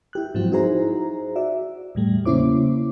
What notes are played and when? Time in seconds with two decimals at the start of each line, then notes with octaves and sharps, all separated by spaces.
0.13 E4 G4 F#6
0.35 G#2 F3 F#3 C4 F#4
0.52 D#4 E4 F#4 G#4 C5 A#5
1.36 F#4 D5 E5
1.95 E2 A2 G3 A3
2.25 C#3 A#3 C#4 E4 C5 D6